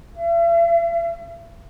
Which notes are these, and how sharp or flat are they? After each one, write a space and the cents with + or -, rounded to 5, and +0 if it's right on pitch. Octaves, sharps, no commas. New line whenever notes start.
E5 +45